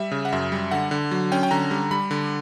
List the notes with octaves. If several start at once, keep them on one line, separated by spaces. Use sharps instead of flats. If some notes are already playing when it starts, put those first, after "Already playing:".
Already playing: G3 E5
C#3
F#5
F#2 E5
G3
D3 F#5
D3
F#3
C#4 G5
G5
D3 A#5
G3
G3 B5
D3